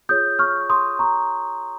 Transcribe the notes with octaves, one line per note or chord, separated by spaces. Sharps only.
F4 G#4 C#5 D#6 G6
C#6 F6
C6 D#6
A#5 C#6